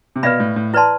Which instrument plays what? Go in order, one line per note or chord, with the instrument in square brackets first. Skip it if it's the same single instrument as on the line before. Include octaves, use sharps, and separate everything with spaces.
[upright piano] C3
[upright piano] B2 [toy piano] B4 D5 F5 B5
[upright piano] A2
A2
[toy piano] E4 B4 D5 A5 C6